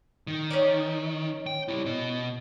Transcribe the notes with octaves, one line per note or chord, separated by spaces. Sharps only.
D#3
C#4 D#4 D5
G5
G3 E4
B2 D#5